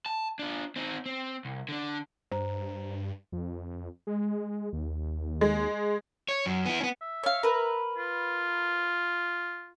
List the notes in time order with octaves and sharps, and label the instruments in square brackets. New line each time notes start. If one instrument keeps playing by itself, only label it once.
[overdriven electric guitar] A5
D4 F4
C4 D#4
C4
C2
D3 D4
[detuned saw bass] G2 [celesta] C5 A#5
[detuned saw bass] F2
G#3
D#2
[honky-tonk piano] G#3
[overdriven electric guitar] C#5
F#2
B3 E4
B3 C#4
[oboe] E5
[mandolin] C#5 F5
A#4 B4
[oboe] F4